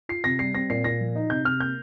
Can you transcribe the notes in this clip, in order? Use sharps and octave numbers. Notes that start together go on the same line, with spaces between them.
F4 C7
C3 A#6
G3 C7
C4 A#6
A#2 C7
A#2 A#6
F3
D#4
C3 G6
C3 F6
A#3 G6